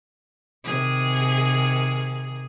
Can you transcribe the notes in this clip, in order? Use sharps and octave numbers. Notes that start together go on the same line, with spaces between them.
C3 D#3 G#4